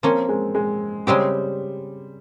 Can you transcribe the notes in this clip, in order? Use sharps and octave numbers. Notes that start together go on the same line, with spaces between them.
F3 A#3 C4 C#4
G#3
G#3
C#3 G3 G#3 C4 G4